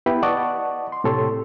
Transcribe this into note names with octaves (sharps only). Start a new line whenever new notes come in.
B3 E4 G4 B4 G5 B5
D5 D#5 F#5 A5 C#6 D6
C6
A2 C3 G4 A4 C#5 C6